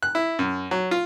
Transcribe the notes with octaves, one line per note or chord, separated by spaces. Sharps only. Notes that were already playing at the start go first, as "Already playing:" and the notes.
F#6
E4
F#2
F#3
F4